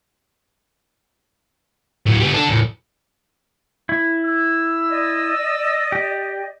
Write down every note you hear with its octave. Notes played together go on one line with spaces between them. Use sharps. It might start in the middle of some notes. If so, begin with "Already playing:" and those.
A2 F#3
G3 B3
D4 A4
E2 A2
E4
E6
D5 D#5
G4